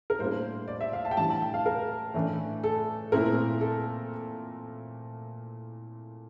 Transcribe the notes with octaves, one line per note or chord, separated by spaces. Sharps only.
A#4
A2 G3 A#3 D4 C5
D5
E5
F5
A5
G5
A2 E3 G3 D4 A5
A5
G5
F5
A#4
A2 E3 A3 D4
A4
A#2 A3 C4 E4 A#4
A4